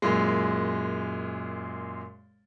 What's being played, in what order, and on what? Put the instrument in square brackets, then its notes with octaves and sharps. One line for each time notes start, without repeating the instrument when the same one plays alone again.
[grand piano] F#2 A#2 G#3